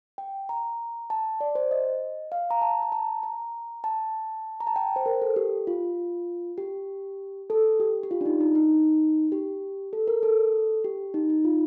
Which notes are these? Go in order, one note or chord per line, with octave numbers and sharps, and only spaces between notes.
G5
A#5
A5
D5
C5
D#5
F5
A#5
A5
A#5
A5
A#5
A5
A#5
A5
G5
C5
A#4
A4
G4
F4
G4
A4
G4
G4
F4
D4
D#4
D#4
D#4
G4
A4
A#4
A4
G4
D#4
D#4
F4